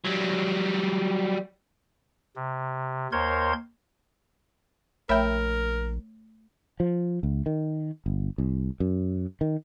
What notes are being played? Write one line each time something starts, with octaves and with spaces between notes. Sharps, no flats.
F#3 G3
C3
D#2 A#4 C5 C#5 C6 G#6
A#1 A3 A#4 C#5 E5 G5 B5
F3
C#2
D#3
G1
C2
F#2
D#3